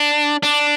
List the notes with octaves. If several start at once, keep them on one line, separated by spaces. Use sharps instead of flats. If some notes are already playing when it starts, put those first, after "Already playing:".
Already playing: D4
D4